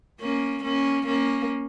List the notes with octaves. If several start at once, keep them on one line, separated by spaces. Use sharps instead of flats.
A#3 C#4
A#3 C#4
A#3 C#4